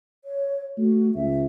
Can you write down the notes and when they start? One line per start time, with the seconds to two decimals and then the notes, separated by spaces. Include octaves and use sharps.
0.25 C#5
0.78 A3 F#4
1.15 C#2 E5